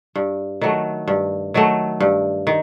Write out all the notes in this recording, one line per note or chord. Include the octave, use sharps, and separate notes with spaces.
G2
D#3 F#3 A3
G2
D#3 F#3 A3
G2
D#3